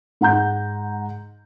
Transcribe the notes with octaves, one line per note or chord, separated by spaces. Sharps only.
G#2 F#5 A#5 G6